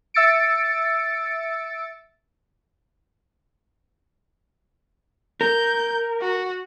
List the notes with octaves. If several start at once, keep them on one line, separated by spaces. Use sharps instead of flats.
E5 E6 A6 C#7 D7
A#4 G6
F#4